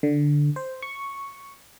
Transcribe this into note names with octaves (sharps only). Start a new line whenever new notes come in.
D3
C5
C#6